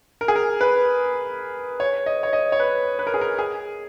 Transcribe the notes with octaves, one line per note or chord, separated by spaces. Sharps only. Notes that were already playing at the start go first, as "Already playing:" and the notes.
A#4
G#4
A#4
B4
C#5
D#5
C#5
D#5
C#5
B4
B4
A#4
G#4
A#4
G#4